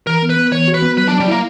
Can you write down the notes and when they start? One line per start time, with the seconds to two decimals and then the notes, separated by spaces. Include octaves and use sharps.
0.07 E3 A#4
0.22 B3
0.30 B4
0.37 B3
0.52 E3 C#5
0.68 F#4
0.74 B4
0.82 B3
0.97 F#3 B4
1.08 D4
1.13 F#3
1.20 G3
1.28 A#3 E4